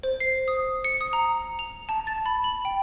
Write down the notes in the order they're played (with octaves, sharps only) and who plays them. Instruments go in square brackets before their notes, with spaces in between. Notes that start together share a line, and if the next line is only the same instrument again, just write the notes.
[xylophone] C5
C7
D#6
C#7
D#6
A#5
F7
A5
A6
B5
F#7
G5